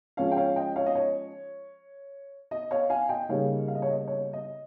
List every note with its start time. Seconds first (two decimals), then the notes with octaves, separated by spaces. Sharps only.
0.17 F3 G#3 C#4 C#5 F5
0.32 G5
0.37 C#5 F5
0.56 D#5 G5
0.76 C#5 F5
0.86 D#5
0.95 C#5
2.51 D#5
2.71 C#5 F5
2.90 F5 G#5
3.09 D#5 G5
3.29 C#3 G3 A#3 D#4 C#5 F5
3.68 F5
3.75 D#5
3.82 C#5
3.90 D#5
4.08 C#5
4.33 D#5